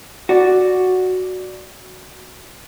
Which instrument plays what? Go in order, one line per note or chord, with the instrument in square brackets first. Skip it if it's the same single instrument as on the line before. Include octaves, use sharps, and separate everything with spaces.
[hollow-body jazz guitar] F#4 D5